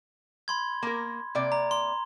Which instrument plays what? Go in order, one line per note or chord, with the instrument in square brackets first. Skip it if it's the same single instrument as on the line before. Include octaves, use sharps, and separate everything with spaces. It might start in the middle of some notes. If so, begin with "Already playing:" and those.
[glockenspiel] B5 C6 G#6
[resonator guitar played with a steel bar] A#3 A#4
C3 A#3 D5
[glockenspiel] A#5
C6